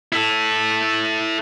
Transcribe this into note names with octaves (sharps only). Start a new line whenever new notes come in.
E4 A4